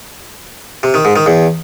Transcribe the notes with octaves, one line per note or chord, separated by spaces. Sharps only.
C3
D#3
G#2
D#3
E2